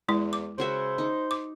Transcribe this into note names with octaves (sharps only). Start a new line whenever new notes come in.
E2 G#3 E4
D6
C#3 F#4 C5 E5
D#4
D6